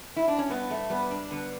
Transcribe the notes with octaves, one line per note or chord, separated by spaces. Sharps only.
E4
D4
C#4
G2 B3
A3
G3 B3
D4
D3 B3